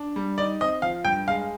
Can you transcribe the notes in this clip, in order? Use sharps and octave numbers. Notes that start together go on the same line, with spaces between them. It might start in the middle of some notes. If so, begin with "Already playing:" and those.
Already playing: D4
G3
D#4 D5
C4 D#5
F3 F5
G2 G5
G#3 F5